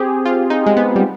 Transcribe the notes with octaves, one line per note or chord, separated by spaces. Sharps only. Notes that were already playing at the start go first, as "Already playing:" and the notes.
Already playing: C4 G4 G#4
F4
D#4
G#3
B3
G3